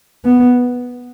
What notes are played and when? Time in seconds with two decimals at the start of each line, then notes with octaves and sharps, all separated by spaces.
0.25 B3